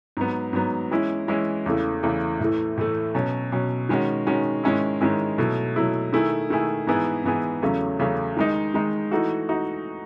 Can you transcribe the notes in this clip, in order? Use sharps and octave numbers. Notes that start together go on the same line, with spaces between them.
G#2 F#3 B3
G#2 F#3 B3
E3 G#3 C#4 E4
E3 G#3 C#4 E4
E2 C#3 E3 A3
E2 C#3 E3 A3
A2 E3 A3
A2 E3 A3
B2 F#3 C#4
B2 F#3 C#4
D#3 G#3 C#4 F#4
D#3 G#3 C#4 F#4
G#2 D#3 G#3 C#4 E4
G#2 D#3 G#3 C#4 E4
B2 F#3 A3 E4
B2 F#3 A3 E4
D#3 A3 E4 G#4
D#3 A3 E4 G#4
G#2 E3 B3 E4 G#4
G#2 E3 B3 E4 G#4
E2 C#3 F#3 A3 C#4
E2 C#3 F#3 A3 C#4
D#3 G#3 D#4
D#3 G#3 D#4
E3 A3 D#4 F#4
D#4 F#4